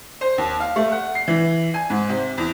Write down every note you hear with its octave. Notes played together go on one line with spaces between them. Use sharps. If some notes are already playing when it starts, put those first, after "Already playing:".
C5
D#2
F5
A3
F#5
C7
E3
G#5
G#2
C3
E2